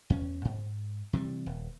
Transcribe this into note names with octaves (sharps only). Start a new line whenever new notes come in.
E2 C#4
G#2
C3 E3 F3 G3
D#1